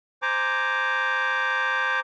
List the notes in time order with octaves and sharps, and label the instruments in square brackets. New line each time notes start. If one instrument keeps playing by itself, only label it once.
[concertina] C5 G#5 A#5 D6